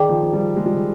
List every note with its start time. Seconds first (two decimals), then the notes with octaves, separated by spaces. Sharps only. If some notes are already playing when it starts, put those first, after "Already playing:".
Already playing: D#3 G#4 D5 G5 D6
0.09 F3
0.23 F3
0.33 G3
0.56 G#3
0.66 G3
0.75 F3